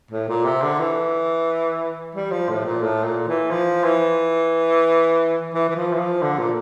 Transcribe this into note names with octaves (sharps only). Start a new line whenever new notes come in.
A2
A#2
C3
D3
E3
G3
F3
A2
A#2
A2
A#2
E3
F3
E3
E3
E3
F3
E3
F3
D3
A#2